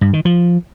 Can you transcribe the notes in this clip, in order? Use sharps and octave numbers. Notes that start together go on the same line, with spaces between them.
G2
D#3
F3